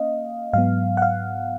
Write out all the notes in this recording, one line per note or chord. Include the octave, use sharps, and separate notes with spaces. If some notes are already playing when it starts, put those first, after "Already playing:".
Already playing: A#3 C#4 D#5 F5
G#2 F#3 B3 F5
F#5
F5